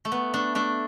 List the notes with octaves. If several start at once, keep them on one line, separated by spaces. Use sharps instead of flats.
A3
B3
A3 D4
A3 D4